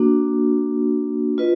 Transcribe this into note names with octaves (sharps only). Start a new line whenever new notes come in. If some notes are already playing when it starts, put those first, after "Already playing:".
Already playing: A#3 D4 F#4
F4 B4 D#5